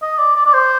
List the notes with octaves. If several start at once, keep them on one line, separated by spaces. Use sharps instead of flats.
D#5
D5
D5
D5
C5